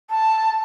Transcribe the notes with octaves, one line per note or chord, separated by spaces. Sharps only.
A5